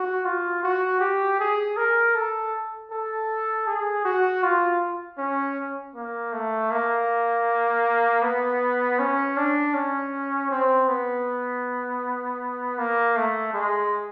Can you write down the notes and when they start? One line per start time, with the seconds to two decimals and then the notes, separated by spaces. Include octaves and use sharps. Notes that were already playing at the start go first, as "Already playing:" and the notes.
Already playing: F#4
0.25 F4
0.63 F#4
1.01 G4
1.40 G#4
1.77 A#4
2.15 A4
2.91 A4
3.67 G#4
4.05 F#4
4.43 F4
5.18 C#4
5.95 A#3
6.33 A3
6.71 A#3
8.22 B3
8.99 C#4
9.37 D4
9.74 C#4
10.51 C4
10.88 B3
12.78 A#3
13.17 A3
13.54 G#3